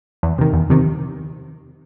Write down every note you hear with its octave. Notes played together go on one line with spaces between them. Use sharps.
E2
C3 D#3
E2
C3 D#3